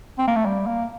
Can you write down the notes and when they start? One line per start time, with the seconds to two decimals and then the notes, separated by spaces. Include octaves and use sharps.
0.19 C4
0.28 A#3
0.36 A3
0.46 G3
0.67 A#3